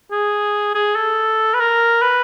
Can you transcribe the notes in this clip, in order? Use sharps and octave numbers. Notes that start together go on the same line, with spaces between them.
G#4
G#4
A4
B4
A#4
B4